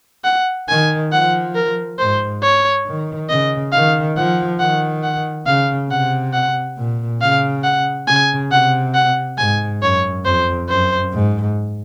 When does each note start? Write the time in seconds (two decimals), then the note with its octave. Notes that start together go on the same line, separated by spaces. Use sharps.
0.24 F#5
0.68 D#3 G#5
1.12 F3 F#5
1.55 A#4
1.99 G#2 C5
2.42 C#5
2.86 D#3
3.29 C#3 D#5
3.72 D#3 F5
4.16 F3 F#5
4.60 D#3 F#5
5.03 F#5
5.47 C#3 F5
5.91 C3 F#5
6.33 F#5
6.77 A#2
7.21 C#3 F5
7.64 F#5
8.07 C#3 G#5
8.51 C3 F#5
8.95 F#5
9.38 G#2 G#5
9.81 F#2 C#5
10.25 F2 C5
10.69 F#2 C5
11.13 G#2